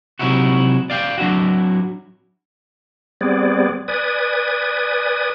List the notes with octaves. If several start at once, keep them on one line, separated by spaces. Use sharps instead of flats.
C3 F#3 G#3 D#4 E4 F#4
D5 F5 G5
F#3 D4 E4 F#4
G3 B3 C4 G#4 D5
B4 D5 G#5 D#6